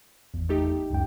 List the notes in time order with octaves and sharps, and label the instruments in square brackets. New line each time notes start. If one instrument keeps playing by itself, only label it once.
[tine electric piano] G#1 E2
[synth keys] A3 D#4 G4
[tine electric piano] C#2 F#2 G5